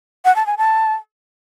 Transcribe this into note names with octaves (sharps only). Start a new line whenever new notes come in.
F#5
A5
G#5
A5